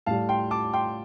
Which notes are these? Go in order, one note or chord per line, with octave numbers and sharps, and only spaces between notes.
A2 G3 F5 A5
G5 C6
A5 D6
G5 C6